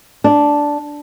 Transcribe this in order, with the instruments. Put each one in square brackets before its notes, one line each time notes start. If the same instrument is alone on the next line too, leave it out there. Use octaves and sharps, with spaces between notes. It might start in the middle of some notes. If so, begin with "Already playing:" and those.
[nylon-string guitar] D4